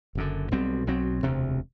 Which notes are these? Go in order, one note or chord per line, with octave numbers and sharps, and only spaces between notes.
F#1 F#2 D3
B1 B2 G3 C4
B1 B2 F#3 C4
E1 D2 C3